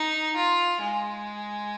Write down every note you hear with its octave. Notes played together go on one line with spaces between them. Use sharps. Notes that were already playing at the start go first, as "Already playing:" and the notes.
Already playing: D#4
F4
G#3